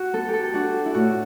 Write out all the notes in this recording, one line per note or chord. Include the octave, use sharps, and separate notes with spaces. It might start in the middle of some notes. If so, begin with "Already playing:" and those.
Already playing: F#4
B3 A4
G4
A4
D4 F#4
E4
A2 F#4